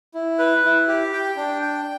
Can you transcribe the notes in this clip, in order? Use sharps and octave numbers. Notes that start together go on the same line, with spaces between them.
E4
B4
E4
G4
G5
D4
G5